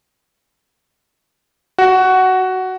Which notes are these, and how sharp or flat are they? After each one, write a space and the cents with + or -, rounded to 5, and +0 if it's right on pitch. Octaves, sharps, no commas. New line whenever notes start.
F#4 +10